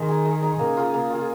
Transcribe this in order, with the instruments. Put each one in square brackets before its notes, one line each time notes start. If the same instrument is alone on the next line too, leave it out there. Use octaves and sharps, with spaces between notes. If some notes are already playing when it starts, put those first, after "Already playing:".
Already playing: [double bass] D#3 [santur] G#3
[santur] D#4 G#4
G#3
D#4 G#4
[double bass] C#3 [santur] A#3
[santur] F4 G#4
A#3
F4 G#4